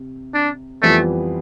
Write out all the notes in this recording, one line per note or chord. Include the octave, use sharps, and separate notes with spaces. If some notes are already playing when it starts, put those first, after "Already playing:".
Already playing: C3
D4
F2 E3 G3 A3 B3 F4